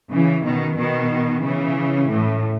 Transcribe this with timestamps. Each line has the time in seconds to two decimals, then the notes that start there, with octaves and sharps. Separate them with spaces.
0.12 C#3 E3
0.44 B2 D#3
0.77 B2 D#3
1.43 C#3 E3
2.08 A2